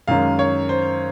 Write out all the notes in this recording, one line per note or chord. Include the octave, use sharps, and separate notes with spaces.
F#2 D#3 G#3 C#4 F5
C#5
C5